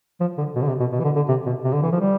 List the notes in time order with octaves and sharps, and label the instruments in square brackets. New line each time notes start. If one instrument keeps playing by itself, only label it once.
[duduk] F3
D3
B2
D3
C3
B2
B2
E3
D3
D3
C3
B2
C3
D3
E3
F3
G3